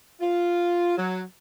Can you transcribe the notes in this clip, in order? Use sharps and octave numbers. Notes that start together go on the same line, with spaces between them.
F4
F#3